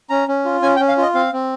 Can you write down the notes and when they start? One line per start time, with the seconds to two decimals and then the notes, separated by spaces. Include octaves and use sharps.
0.10 C#4 A#5
0.28 C#4
0.45 F4
0.62 C#4 G#5
0.76 G5
0.79 C#4
0.88 F5
0.98 F4 D#5
1.15 C4 F5
1.33 C4